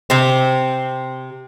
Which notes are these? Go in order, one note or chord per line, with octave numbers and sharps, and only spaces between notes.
C3 C4